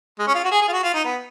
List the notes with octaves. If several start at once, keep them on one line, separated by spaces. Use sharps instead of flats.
G#3
C#4
F4
F#4
G#4
G#4
F4
F#4
F4
D#4
B3